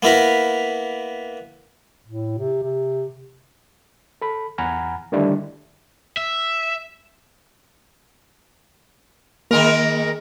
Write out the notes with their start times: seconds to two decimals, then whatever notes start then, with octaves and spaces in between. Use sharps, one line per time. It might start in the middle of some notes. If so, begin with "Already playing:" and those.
0.03 A#3 B3 E4 A#4 B4
2.07 A2
2.38 C3
2.63 C3
4.22 A4 B5
4.58 E2 F#5 G#5 A#5 B5 F6
5.12 D3 D#3 G3 A3 D4 E4
6.17 E5
9.51 D#3 G#3 A#3 A#4